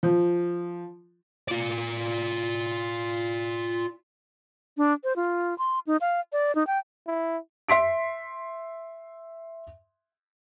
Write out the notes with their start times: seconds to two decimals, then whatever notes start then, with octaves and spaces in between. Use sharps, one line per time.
0.03 F3
1.48 F4 D5
4.77 D4
5.04 C5
5.16 F4
5.58 C6
5.87 D#4
6.01 F5
6.33 D5
6.55 D#4
6.67 G5
7.07 E4
7.69 E5 C6 B6 D7